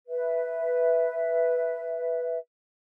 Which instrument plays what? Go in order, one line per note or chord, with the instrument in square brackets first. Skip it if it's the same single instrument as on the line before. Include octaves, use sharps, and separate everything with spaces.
[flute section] B4 E5